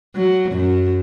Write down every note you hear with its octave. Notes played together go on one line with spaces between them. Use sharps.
F#3
F#2